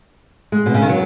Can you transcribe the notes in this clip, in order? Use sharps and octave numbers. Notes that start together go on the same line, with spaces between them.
G#3
B2
C#3
D#3
F#3